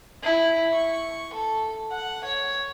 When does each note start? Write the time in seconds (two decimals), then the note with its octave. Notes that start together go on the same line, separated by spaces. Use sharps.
0.23 E4
0.73 C#6
1.33 A4
1.91 F#5
2.24 C#5